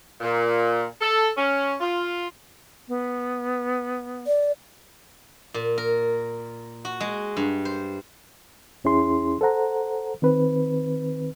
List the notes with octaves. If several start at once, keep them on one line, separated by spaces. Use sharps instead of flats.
A#2
A4
C#4
F4
B3
D5
A#2
A#4
F#4
G#3
G2
C5
E2 C#4 E4 G#4 C6
A4 C5 F#5 A#5
D#3 C4 B4